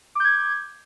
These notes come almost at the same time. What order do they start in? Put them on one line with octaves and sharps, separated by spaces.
D6 G6 G#6